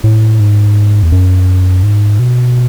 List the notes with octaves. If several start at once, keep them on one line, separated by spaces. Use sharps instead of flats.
A2
G#2
E2
F#2
G#2
B2